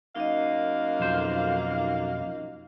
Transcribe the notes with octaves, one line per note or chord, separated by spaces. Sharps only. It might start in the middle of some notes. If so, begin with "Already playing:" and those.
F#2 A#3 D#4 D#5 F5
B1 F2 C5